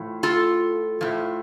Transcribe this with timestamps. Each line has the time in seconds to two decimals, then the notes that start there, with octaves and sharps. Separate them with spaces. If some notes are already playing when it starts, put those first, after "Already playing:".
Already playing: A2 F3
0.23 F4 A4
1.01 A2 F3